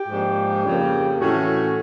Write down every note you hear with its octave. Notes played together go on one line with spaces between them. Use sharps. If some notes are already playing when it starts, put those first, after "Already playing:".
Already playing: G4
G#2 F3 A#3 D4
F2 C#3 F3 A#3
A2 E3 A3 C#4 F#4